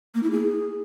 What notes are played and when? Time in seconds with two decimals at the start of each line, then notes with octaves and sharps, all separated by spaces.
0.15 A#3
0.23 E4
0.31 G#4